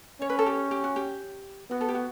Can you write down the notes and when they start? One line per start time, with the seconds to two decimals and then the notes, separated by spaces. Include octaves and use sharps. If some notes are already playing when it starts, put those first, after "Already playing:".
0.21 C#4 C#5
0.30 B4
0.39 A4
0.46 G4
0.71 G4
0.84 F#4
0.96 G4
1.70 B3 F#4
1.81 A4
1.89 G4
1.95 F#4